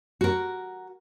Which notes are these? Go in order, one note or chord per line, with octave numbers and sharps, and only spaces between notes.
F#4 A#4